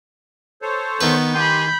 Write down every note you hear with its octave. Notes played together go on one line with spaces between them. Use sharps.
A4 C5 C#5
D#3 B3 B4
G4 G#5 B5 C6 G6